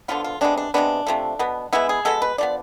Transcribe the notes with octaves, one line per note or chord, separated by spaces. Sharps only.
D3 F3 B3 F4
F4
C3 G#3 B3 D4
D4
C3 F3 G#3 B3 D4
C3 F3 A3
B2 B3
E3 G#3 B3 E4
G#4
B2 G#3 B3 A4
B4
D3 F3 B3 D5